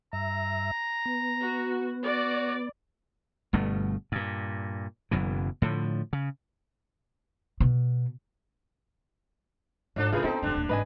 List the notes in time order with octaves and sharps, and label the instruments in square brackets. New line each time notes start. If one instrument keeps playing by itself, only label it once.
[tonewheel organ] G2 E5 [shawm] A#5
[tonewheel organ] B3
[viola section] F#4
[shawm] F#4 [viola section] D5
[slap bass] G1 G2 B2 A3
G2 A#2
F#1 F#2 B2 E3
A2 D3 F3
C#3
[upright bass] B2
[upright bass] G#2 [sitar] F3 D4 A4
[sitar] A2 A3 [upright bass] C#3 [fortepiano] F4 G#4 B4
[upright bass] B3 [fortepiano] C4 A4 C5 [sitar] D#4
[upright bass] F1 E3 [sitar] D3 D4
[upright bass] D#1 A#3
[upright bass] G1 G#2 [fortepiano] B4 D#5 G#5